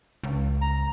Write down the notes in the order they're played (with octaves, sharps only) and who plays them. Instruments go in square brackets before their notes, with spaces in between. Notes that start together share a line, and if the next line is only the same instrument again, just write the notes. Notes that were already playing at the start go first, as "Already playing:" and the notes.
[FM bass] C#2
[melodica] A#5